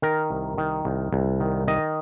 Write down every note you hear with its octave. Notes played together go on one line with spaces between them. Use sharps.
D#3 A#4
C2
D#3
C2
C2
D#3
D#3 D#5